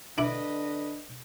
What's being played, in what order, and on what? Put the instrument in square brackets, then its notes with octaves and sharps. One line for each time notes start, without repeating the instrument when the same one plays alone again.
[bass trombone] D3 [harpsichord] D4 E4 [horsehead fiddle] B4 D#5